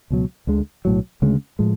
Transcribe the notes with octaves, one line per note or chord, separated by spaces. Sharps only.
C#2 B2 F#3
D2 D3 G#3
B1 A2 F#3
D2 C#3 G#3 C#4
A2 F3 G#3